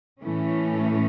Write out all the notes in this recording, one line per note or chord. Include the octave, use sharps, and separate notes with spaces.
A2 E3 A3 C#4